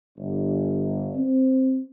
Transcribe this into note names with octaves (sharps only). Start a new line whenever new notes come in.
G1
C4